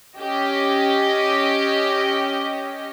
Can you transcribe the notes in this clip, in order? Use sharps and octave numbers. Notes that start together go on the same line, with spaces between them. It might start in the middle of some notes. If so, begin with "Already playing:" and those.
C#4 G4 D#5